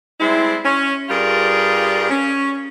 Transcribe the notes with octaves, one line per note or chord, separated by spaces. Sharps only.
G3 G#3 C4 E4
C#4
G2 G3 F4 G#4 A#4 D5
C#4